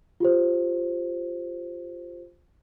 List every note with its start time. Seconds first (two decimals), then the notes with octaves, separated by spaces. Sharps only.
0.20 F4 G4 C5